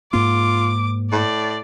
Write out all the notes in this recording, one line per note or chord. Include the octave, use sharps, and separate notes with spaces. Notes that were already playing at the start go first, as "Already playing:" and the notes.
G#2 A#3 F4 D6
A2 D5